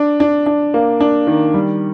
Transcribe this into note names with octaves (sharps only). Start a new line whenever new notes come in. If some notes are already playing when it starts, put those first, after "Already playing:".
Already playing: D4
D4
D4
A#3
D4
D#3
G3